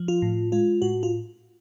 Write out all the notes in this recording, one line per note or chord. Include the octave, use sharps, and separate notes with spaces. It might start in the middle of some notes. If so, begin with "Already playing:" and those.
Already playing: F3
F4
A2
G#3 F4
A2 F#4
F4